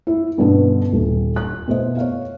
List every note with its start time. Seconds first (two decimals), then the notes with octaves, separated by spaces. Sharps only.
0.07 E4
0.38 G2 B2 D3 B3 C#4
0.92 D#1
1.36 F#6
1.68 B2 A3 C5 D#5
1.97 C#5 F5